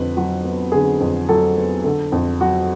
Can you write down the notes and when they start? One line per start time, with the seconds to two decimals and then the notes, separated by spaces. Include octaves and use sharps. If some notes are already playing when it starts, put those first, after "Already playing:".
Already playing: F2 D3 B4
0.17 F#3 F#4
0.44 B3
0.72 D3 G#4
1.00 F2
1.29 F#3 A4
1.56 B3
1.84 D3 A4
2.12 F2
2.41 F#3 F#4